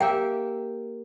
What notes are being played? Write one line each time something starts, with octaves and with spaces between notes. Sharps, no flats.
A#3 G4 E5 G5